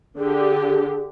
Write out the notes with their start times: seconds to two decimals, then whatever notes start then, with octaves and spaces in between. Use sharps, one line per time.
0.18 D3 G4 G#4